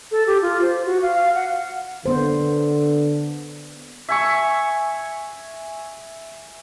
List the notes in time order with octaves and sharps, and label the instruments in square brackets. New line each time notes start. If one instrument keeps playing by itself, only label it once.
[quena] A4
G4
F4
C5
F#4
F5
F5
F#5
[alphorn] D3 [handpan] B3 C5
[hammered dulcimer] E5 G#5 C#6